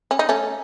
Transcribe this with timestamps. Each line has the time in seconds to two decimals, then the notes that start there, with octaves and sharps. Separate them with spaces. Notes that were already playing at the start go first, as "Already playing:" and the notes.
0.11 C#4
0.19 D#4
0.29 A3 C#4